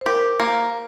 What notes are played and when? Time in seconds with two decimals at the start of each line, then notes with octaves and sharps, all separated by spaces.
0.01 C5
0.06 G4 A#4
0.40 A#3